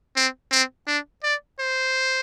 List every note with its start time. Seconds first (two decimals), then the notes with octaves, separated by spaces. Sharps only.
0.16 C4
0.52 C4
0.87 D4
1.24 D5
1.60 C5